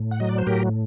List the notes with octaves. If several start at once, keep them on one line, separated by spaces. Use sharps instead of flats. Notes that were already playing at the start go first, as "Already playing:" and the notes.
Already playing: A2
F#5
F#3 D#5
D5
C5
A2 G4 A#4